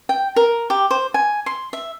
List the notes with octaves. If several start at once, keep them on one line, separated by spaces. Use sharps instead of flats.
G5
A#4
G4
C5
G#5
C6
E5